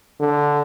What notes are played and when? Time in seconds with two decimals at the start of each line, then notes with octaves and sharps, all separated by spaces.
0.20 D3